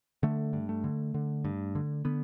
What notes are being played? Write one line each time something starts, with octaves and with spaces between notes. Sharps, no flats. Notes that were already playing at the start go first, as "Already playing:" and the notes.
D3 A3
G2
A3
D3
D3
G2
D3
D3 B3